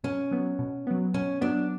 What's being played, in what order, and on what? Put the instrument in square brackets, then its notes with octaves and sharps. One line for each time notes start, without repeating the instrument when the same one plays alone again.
[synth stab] B2 [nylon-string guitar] C#4
[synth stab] F#3 B3
B2
F#3 B3
[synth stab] B2 [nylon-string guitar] C#4
[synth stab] F#3 B3 [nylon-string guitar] D4